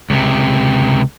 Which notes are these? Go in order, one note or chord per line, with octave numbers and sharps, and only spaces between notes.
C#2 C3